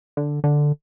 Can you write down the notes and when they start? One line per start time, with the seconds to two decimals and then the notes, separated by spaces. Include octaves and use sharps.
0.17 D3
0.44 D3